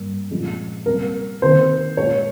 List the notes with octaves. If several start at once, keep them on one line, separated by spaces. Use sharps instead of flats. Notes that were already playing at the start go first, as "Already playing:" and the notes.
Already playing: G2 G3 A#3
A#2 F3 G#3
C3 G3 A#3 A#4
C3 D#3 A#3 C5
A#2 G#3 C#5